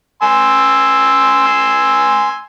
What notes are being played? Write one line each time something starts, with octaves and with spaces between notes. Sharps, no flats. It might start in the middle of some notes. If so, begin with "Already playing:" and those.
G#5 C6 E6